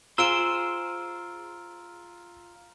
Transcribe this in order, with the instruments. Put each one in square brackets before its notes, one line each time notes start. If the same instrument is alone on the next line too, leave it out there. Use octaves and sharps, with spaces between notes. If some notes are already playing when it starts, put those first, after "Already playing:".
[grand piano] F4 [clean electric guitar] G#4 C5 [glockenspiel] A#5 F6 D7 [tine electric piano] E6